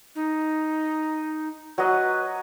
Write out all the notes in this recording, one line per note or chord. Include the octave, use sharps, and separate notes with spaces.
D#4
F#3 B4 D#5